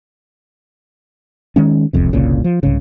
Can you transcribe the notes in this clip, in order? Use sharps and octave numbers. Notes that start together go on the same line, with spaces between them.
D#3 G#3 C#4
E1 C2 F2 C3
F#1 C2 A#2 C#3
F3
C2 G#2 C#3